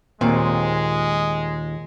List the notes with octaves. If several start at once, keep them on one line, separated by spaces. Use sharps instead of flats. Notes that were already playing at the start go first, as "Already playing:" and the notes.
D#2 A#2 G#3 C4